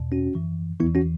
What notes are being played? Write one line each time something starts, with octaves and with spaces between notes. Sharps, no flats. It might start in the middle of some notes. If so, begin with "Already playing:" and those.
Already playing: E2 B2
C#4 F#4
F#2 E3
E2 E3 B3 E4
C#4 F#4